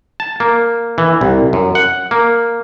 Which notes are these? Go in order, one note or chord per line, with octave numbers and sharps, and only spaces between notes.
A5
A#3
E3
C2
F#2
F#5
A#3